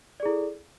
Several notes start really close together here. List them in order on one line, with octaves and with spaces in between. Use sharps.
D5 G#4 E4 A4